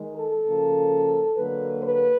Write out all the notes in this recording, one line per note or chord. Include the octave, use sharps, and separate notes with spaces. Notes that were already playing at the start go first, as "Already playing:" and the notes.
Already playing: D#3 G#3
A4
C#3 F3 A#3
D3 F#3 A#3 B4
B4